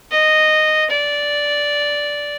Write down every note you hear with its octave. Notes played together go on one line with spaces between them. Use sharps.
D#5
D5